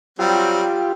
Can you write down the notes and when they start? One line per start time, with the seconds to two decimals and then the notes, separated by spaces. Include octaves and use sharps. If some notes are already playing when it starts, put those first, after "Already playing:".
0.19 F#3 G3 C4 F4 G4